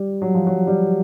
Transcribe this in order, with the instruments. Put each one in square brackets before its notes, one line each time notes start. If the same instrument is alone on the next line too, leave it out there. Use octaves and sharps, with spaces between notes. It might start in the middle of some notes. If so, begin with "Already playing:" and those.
Already playing: [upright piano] G3
F#3
F3
F#3
G3